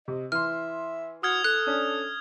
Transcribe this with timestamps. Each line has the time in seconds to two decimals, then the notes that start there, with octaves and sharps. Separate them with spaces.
0.08 C3 D#5
0.32 E3 E5 C6 F6
1.23 F#4 D#6 F6 G#6
1.44 A4 F#6
1.67 C#4 D4